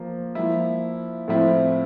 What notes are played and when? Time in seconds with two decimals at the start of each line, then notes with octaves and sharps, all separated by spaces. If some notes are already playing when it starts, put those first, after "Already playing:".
Already playing: F3 A#3
0.35 F3 A#3 E4
1.28 A2 F3 C4 E4